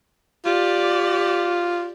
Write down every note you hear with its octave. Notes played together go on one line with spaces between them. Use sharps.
F4 G4 D5